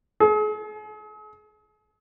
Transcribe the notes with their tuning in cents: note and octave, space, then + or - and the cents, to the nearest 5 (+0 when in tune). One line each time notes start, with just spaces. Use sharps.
G#4 +40